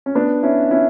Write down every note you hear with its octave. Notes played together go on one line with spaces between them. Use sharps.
C#4
B3 D4
C#4 E4
C#4 E4